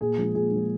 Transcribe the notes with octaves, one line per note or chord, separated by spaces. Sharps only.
A#2 G#4
F3 G#3
A#2 G#4
F3 G#3